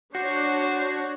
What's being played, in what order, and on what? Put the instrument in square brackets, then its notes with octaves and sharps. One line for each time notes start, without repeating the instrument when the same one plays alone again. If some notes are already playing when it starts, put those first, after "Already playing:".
[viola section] D4 C#5 [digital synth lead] F#4 [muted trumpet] C5